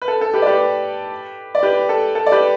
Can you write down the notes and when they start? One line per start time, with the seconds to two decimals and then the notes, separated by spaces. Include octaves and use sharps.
0.02 B4
0.08 A4
0.21 A4
0.34 G4 B4
0.42 D5
0.46 G4 B4
1.55 D5
1.63 G4 B4
1.89 A4
2.15 A4
2.26 D5
2.32 G4 B4